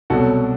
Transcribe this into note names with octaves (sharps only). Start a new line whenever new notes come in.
C2 B2 F#3 F#4 A4